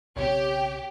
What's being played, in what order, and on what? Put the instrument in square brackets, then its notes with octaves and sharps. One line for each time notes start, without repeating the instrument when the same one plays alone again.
[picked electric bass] B1 C#3 C4 [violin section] G4 [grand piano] C#5